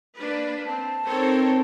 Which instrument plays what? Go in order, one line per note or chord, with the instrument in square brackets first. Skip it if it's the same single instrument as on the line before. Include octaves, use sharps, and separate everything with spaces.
[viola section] A#3 D4 B4
[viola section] C4 [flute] A5
[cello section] C4 D#4 A#4 [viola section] A4 C5 C#5